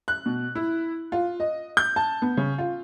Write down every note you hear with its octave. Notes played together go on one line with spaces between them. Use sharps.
F#6
B2
E4
F4
D#5
G6
A5
B3
C#3
F4